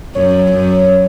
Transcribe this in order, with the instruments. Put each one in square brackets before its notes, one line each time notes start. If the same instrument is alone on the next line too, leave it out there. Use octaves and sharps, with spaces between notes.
[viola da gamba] F#2 [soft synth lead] C#5
[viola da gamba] F#2